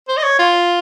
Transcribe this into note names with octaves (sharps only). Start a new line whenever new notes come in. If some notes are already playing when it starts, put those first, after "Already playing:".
C5
D#5
C#5
F4